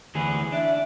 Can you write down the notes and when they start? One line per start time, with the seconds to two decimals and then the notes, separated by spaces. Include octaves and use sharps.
0.15 D2 E3 G#4
0.52 D4 E5